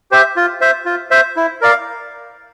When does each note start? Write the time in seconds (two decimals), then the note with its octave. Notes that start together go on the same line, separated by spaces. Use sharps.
0.11 G4 C5 E5
0.36 F4
0.61 C5 E5
0.85 F4
1.11 C5 E5
1.37 E4
1.61 A#4 D5 F5